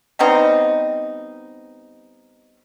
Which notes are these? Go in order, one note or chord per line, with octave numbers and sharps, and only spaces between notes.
G3 B3 C4 D#4